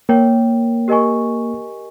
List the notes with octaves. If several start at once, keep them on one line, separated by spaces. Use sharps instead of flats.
A#3 A#4 C#5 G5
G4 A#4 D#5 G#5 C#6